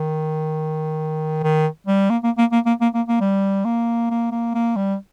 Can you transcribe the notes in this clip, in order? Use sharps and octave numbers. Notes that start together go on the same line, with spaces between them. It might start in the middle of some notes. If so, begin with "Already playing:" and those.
Already playing: D#3
D#3
G3
A#3
A#3
A#3
A#3
A#3
A#3
A#3
A#3
G3
A#3
A#3
A#3
A#3
G3